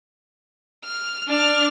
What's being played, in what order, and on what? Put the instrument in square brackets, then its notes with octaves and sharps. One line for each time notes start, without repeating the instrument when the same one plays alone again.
[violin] F6
D4 F6